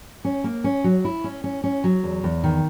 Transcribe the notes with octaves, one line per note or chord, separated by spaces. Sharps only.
C#4
A#3
C#4
F#3
E4
C#4
C#4
C#4
F#3
E2
E2
D#3